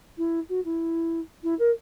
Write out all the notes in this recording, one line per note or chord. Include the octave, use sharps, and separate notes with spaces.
E4
F#4
E4
E4
A#4